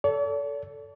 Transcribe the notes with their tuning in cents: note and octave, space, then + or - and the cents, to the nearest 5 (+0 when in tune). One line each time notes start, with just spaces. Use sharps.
A4 +0 D5 -45